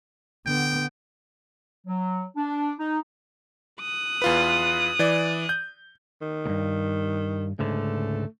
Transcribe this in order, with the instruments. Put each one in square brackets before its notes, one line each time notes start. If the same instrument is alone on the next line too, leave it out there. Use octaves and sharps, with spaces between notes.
[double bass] D3 B3 [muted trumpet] G5
[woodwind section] F#3
D4
D#4
[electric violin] D#6 F#6
[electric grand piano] E2 F4 B4
E3 D5
G6
[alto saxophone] D#3
[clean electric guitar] D2 G2
[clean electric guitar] C#2 G#2 D3 [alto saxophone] A3